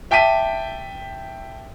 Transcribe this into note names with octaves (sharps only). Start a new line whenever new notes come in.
E5 G5 A5 D6 B6 D#7